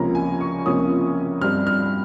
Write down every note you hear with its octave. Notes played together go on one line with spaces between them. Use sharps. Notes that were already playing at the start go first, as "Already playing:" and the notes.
Already playing: C#2 C3 F3 A#3 C#4 A#5
G#5
C#6
C#2 C3 F3 A#3 C#4 D#6
G2 G3 C4 F6
F6